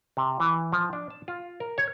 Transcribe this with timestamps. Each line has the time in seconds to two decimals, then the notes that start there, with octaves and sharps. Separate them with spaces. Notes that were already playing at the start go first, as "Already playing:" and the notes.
0.17 C3
0.40 E3
0.72 F3
0.93 D4
1.10 A5
1.28 F4
1.60 A#4
1.78 C#5